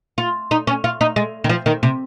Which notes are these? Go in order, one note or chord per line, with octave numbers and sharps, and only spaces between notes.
F4
D#4
C#4
F4
D#4
G#3
D#3
F3
D#3
C3